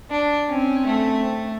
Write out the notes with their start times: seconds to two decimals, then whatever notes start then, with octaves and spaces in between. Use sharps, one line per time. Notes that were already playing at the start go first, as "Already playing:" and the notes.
0.11 D4
0.50 C4 C#4
0.86 A3